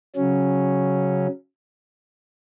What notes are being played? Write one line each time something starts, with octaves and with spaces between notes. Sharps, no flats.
C#3 F#3 C#4